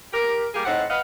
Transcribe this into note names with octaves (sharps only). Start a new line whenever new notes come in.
G4 A#4
G3 A#3 G4 G#4
A2 C4 D#4 F#5
B4 D#5 F5 F#5